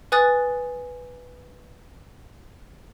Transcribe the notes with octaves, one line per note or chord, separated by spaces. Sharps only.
B4 G#5 D#6 F#6 A6